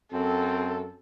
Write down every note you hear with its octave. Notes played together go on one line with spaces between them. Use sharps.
F#2 C4 A4